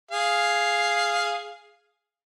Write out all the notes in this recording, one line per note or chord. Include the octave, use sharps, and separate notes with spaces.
G#4 F5